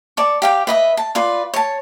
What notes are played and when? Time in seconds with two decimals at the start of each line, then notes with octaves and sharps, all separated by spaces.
0.17 D5 A5 C#6
0.42 G4 F5 G5
0.67 B4 D#5 E5
0.97 A5
1.15 F4 B4 D5
1.54 C#5 A5